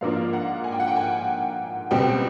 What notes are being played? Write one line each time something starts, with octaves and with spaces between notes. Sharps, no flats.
G#2 F3 A#3 D4 F4 F5
F#5
G#5
G5
F#5
G5
G#5
C#2 B2 G3 C4 G5